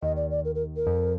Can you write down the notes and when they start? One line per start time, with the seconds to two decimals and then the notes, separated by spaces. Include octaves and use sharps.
0.02 D#2 D#3 D#5
0.16 D5
0.31 D5
0.45 A#4
0.55 A#4
0.76 A#4
0.87 F2 F3